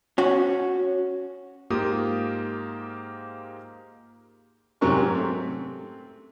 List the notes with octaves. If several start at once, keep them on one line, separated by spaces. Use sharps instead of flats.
C#4 F#4
G#2 A#3 F4 G4 D#6
G#2 C3 F#3 C#4 A#4 C#6
A3 C4